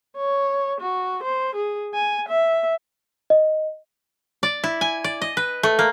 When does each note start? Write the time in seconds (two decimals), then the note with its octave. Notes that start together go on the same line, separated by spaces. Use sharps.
0.17 C#5
0.81 F#4
1.23 C5
1.56 G#4
1.94 G#5
2.29 E5
3.30 D#5
4.43 D5
4.64 E4
4.81 G#5
5.04 D5
5.21 D#5
5.37 B4
5.63 A3
5.79 A#3